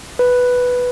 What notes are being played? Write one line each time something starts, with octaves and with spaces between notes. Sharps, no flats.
B4